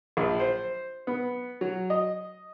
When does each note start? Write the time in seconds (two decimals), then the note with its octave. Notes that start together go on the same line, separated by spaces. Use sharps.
0.17 A#1
0.39 C5
1.07 B3
1.61 F#3
1.90 D#5